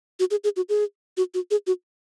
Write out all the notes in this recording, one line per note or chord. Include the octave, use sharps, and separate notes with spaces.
F#4
G#4
G#4
F#4
G#4
F#4
F#4
G#4
F#4